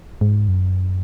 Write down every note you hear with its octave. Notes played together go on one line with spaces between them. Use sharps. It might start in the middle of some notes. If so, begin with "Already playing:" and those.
G#2
F#2